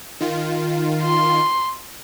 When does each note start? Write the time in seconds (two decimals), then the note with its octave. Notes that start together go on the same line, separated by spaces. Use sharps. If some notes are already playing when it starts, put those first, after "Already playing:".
0.21 D#3 F4
1.03 C6